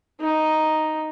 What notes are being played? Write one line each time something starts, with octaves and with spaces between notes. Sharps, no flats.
D#4